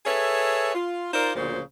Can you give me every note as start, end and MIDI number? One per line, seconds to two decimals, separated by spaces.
0.06 0.74 68
0.06 0.74 69
0.06 0.74 71
0.06 0.74 73
0.06 0.74 76
0.74 1.13 65
1.14 1.32 63
1.14 1.32 65
1.14 1.32 70
1.14 1.32 72
1.14 1.32 74
1.36 1.61 38
1.36 1.61 46
1.36 1.61 49
1.36 1.61 53
1.36 1.61 58
1.36 1.61 72